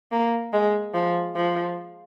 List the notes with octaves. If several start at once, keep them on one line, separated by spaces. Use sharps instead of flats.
A#3
G#3
F3
F3